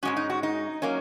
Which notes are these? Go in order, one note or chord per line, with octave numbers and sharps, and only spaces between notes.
G#2 G#3 C#4 F#4
D#4
F#4
D#4
F#3 A#3 C#4